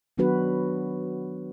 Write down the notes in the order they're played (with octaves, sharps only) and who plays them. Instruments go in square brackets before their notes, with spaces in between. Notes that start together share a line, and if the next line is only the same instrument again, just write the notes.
[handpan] D#3 F#3 B3 D4 F#4 B4